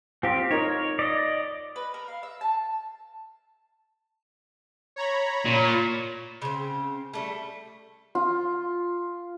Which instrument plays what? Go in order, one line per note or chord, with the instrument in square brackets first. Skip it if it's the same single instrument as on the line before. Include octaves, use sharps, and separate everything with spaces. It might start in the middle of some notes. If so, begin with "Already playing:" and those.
[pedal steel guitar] C4 G4 [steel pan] F4
[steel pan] D#4 A#4 [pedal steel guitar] C#5
[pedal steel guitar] D5 D#5
[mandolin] B4
A#4
F5
E5
A5
[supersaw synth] C#5 A#5 B5
[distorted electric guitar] A#2
[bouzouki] C#3 C4
G3 A3
[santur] F4